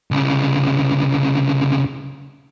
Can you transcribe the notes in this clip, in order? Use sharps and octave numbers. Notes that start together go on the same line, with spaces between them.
C2 C#3